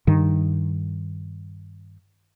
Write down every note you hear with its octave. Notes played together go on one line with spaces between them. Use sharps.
G2 D#3